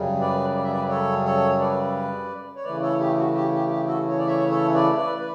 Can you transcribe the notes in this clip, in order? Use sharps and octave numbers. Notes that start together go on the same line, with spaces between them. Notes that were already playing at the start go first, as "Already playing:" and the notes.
Already playing: F#2 C#3 G3
B4 D5
D5
E5
B4 D5
A4 C#5
A4 C#5
B4 D5
C#5
C#3 E3 A3 B4 D5
A4 C#5
G4
F#4
G4
G4
G4
F#4 A4
C#5
D5
C#5 E5
A4 C#5
B4 D5
B4 D5
B4